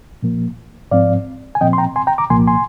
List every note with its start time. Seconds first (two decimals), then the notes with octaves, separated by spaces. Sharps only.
0.23 A#2 F3 A#3
0.91 G#2 F3 C4 D5 F5
1.55 G#5
1.61 A#2 F3 C4 D#5 G5
1.73 C6
1.78 G5 A#5
1.96 G#5 C6
2.07 G5 A#5
2.18 A#5 D6
2.30 C2 A#2 F3 A#3 G#5 C6
2.48 G#5 C6